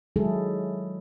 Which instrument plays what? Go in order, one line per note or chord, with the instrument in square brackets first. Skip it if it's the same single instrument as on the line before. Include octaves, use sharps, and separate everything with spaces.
[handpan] D#3 F#3 G#3 E4 G#4 A4